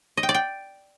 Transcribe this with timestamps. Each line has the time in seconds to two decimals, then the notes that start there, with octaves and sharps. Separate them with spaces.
0.17 D#5
0.23 G5
0.29 D5
0.34 G5